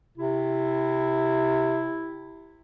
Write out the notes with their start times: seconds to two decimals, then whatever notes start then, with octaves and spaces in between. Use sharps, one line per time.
0.17 C3 E4